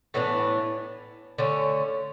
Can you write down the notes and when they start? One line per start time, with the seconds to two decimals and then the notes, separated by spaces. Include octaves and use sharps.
0.14 A2 E3 B3 D4
1.38 D3 A3 C#4